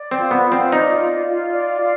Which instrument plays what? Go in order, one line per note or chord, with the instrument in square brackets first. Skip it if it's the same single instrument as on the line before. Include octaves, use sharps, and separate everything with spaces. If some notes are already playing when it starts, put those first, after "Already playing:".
Already playing: [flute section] D5
[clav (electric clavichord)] C4
[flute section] F4
[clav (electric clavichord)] B3
[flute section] F4
[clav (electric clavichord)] C4
[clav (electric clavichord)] D#4 [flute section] D5
[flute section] F4
F4
D5
F5